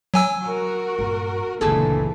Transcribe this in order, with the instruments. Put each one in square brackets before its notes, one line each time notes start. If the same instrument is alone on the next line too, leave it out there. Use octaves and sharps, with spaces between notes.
[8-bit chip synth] F#3 G#5 E6
[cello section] F#4 A#4
[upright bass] G2 A#2
[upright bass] F#1 C#2 [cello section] A#2 D3 E3 [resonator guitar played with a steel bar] A3 G#4 A4